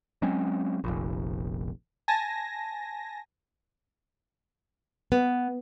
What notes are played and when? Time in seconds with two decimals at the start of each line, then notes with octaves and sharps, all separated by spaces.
0.22 F#3 G#3 C4 C#4
0.84 F1 A#1
2.08 G#5 A5 A#6
5.12 B3